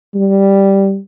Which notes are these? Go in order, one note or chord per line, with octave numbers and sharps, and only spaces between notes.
G3